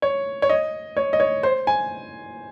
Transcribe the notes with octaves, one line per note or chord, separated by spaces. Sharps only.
C#5
C#5
D#5
C#5
D#5
C#5
C5
G#5